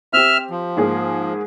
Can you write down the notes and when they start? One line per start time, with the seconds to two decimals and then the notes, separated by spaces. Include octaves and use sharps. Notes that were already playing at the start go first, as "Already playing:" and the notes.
0.13 C4 G4 E5 F6
0.50 F3
0.77 G#2 A#3 G#4